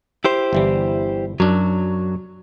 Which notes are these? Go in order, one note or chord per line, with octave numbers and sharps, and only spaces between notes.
E4 G4 C5
G1 E3 G3
F#2 F#3 D4